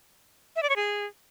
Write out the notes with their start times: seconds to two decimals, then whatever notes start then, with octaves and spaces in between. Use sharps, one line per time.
0.56 E5
0.63 D5
0.69 C#5
0.76 G#4